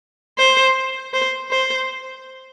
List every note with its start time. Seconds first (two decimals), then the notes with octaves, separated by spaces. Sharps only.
0.38 C5
1.13 C5
1.51 C5